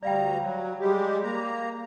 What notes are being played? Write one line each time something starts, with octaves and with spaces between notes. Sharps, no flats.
D2 G3 D5 F5 G5 A#5
F#3
G3 G#3 G4
A#3 A#5